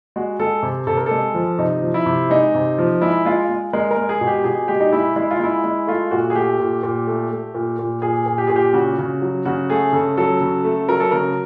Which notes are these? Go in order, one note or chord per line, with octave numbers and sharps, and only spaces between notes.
G#3 F#4
G#3 A4
C3
C3 A4
A#4
G#3 A4
F3
C3 D#4
F3
E4
C3
G#3 D#4
C3
F3
G#3 E4
G#3 F4
G#3
G#3 A#4
A#4
G#3
G#4
B2
G4
B2 G#4
G#3 G4
D#4
G#3 E4
G#3 E4
F4
G#3 E4
G#3
A3 F4
A#2 F#4
G#4
A3 G4
A#2
A#2
A3
A3
A#2
A#2
A#2 G#4
A#2
G4
A#2 G#4
G4
C#3 F#4
C#3
F#3
C#3 F#4
A3 G#4
C#3 A4
F#3 A4
C#3
A3
F#3 A#4
A4
C#3 A#4